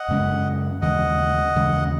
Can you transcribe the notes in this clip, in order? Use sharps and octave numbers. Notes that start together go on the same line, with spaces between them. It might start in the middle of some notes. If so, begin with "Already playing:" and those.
Already playing: D#5 F#5
F#2 C#3 G#3 C#4
D#2 C#3 E3 G#3 D#5 F#5
D#2 C#3 E3 G#3